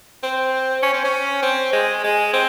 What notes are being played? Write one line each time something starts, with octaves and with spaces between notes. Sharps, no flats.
C4
C#4
C4
C#4
C4
G#3
G#3
C4